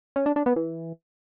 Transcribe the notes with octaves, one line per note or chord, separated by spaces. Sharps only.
C#4
D4
D4
B3
E3